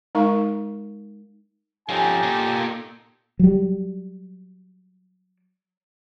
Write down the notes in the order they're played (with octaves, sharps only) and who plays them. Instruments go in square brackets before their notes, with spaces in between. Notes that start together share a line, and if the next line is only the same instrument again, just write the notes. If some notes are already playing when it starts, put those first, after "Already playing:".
[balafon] G#3 D#4 A#4 F5 C#6
[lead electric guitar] F3 C#4 [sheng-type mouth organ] D#4 G4 A4 [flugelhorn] G#5
[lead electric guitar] A#2
[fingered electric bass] F#3 G3